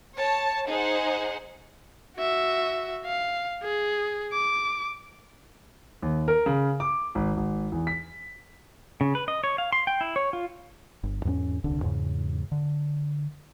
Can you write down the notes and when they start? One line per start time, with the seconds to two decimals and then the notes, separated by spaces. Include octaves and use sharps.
0.16 C#5 A5
0.68 D#4 G#4 C5 F#5
2.17 F#4 E5
3.05 F5
3.63 G#4
4.32 D6
6.02 D#2
6.28 A#4
6.46 C#3
6.80 D6
7.15 G#1
7.37 G#1
7.72 E2
7.87 B6
9.01 C#3
9.15 B4
9.28 D#5
9.44 C#5
9.58 F5
9.72 C6
9.87 G5
10.01 E4
10.16 C#5
10.33 F4
11.03 G1
11.25 E2 G#2 G3 C#4
11.64 D#1 C2 D3 D4
11.82 E2 G#2 C#3
12.52 D3